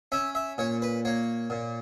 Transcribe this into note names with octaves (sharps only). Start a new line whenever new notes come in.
C#4 E5
E5
A#2 C#5
B4
A#3 C#5
A#2